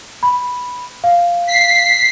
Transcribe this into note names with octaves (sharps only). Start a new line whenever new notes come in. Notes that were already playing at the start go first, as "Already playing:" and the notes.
B5
F5
B6 C7